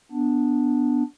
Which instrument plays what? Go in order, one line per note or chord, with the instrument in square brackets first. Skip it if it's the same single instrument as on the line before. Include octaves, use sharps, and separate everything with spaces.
[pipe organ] B3 D4